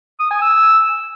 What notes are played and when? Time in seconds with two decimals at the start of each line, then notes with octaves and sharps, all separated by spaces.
0.20 D#6
0.31 G#5
0.41 E6